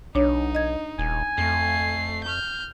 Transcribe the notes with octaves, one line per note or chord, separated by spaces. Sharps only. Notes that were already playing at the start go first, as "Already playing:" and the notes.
B1 D4 D#4 C#5
D#5 G#6
D#1 G#5
F2 A3 C7
F6 G6